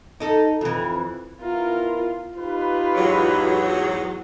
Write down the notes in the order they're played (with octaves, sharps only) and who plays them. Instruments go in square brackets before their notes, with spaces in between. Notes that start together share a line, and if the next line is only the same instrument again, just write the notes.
[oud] D#4 A4
F2 E3
[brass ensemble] B3 E4 A#4 [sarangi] F4
[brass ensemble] D#4 G4 B4 [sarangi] F4
[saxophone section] E2 G#2 F#3